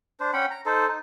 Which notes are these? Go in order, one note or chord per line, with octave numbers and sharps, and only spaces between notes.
D4 C5
C#4 F#5 G5 B5
A#5
D#4 A4 C5
D#4